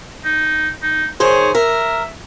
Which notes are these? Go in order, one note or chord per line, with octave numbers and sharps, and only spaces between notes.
D#4
D#4
D#3 G#4 C5 C#5
A#4 E5